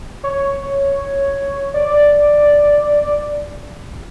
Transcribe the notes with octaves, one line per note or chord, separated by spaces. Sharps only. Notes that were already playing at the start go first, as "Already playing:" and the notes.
C#5
D5